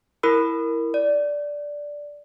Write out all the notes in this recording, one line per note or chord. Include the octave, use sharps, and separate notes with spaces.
E4 A#4 B5 E6
D5